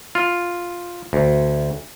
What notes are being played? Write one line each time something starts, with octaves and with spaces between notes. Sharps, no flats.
F4
D2